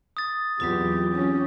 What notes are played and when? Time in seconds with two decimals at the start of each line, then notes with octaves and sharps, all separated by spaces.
0.17 D#6 A6
0.60 E2 F#3 C4 F4 G4
1.13 C#4 G4